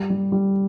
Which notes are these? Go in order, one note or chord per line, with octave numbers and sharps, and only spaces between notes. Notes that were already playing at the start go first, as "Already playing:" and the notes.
Already playing: G3
G3
G3